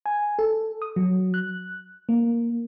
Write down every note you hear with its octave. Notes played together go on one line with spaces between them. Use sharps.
G#5
A4
D#6
F#3
F#6
A#3